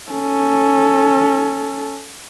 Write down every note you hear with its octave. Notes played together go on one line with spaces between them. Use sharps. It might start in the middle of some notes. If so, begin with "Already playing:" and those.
C#4 A4